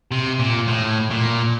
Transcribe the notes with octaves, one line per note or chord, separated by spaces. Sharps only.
C3
A#2
A2
A#2